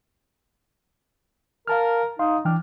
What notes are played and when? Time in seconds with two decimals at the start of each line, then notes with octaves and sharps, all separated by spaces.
1.68 A#4 F5 A5 F6
2.19 D#4 F5 C6
2.45 E3 D4 G5 F6